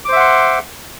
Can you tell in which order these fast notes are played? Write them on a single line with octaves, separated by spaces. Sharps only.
D6 C5 E5 F#5 C6